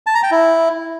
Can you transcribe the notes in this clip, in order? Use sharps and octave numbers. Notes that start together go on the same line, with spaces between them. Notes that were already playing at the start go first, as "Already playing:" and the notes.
A5
A#5
G5
E4